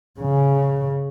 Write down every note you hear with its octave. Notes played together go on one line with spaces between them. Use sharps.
C#3